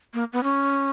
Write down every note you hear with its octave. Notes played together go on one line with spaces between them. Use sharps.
A#3
B3
C#4